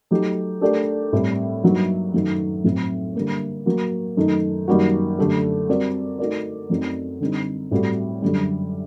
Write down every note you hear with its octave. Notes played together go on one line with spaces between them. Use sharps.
F#3 A3 D#4 G4
A3 D4 G4 A#4 D5
A2 G3 C4
G2 F#3 A#3 D#4 F#4
F#2 D#3 F#3 A3 D#4
A2 F#3 C4
D3 G3 A#3
F#3 A#3 F#4
F#2 D#3 A3 D#4
F#2 D#3 G3 A#3 F#4
F#2 D3 A3 D4 G4
G3 C4 F#4 A#4 D5
A3 D#4 F#4 A#4 D5
F#2 F#3 A3 C4 D#4
D3 G3 C4 D#4
A2 G3 C4 F#4 A4
F#2 D3 G3